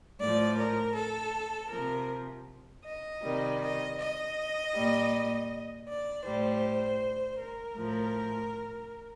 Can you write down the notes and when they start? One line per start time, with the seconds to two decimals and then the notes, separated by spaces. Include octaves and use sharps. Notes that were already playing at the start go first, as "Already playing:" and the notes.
0.20 A2 F3 D5
0.57 A#4
0.95 A4
1.70 C3 F3 A#4
2.85 D#5
3.22 C3 D#3 G3
3.61 D#5
3.98 D#5
4.74 A#2 G3
5.87 D5
6.24 A2 G3 C5
7.39 A#4
7.76 A2 F3